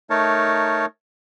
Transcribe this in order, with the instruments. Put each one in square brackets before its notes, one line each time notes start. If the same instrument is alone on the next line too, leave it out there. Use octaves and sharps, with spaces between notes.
[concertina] A3 D#4 A#4 C#5 A5